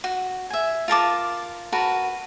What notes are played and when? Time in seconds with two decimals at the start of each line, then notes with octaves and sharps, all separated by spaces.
0.04 F#4
0.50 E5 G#5
0.88 F4 A#4 A5 D6
1.72 F#4 A#4 B4 A5